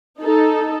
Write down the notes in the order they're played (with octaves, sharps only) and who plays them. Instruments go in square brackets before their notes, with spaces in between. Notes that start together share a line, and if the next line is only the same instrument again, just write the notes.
[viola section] D#4 A4